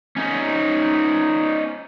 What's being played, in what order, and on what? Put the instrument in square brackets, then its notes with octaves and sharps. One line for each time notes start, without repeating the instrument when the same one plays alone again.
[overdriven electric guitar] C#4 D#4